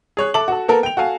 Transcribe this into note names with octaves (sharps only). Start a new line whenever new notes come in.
G#4 C#5 F#6
A4 E5 A5 D6 F#7
F#4 A4
A#3 B3 A4 A#4
G5 F7
F#4 A4 F5 G#5